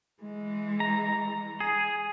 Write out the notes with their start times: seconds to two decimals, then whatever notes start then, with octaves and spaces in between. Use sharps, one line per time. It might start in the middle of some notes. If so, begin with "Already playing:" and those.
0.22 E3 G#3
0.80 A#5
1.60 G#4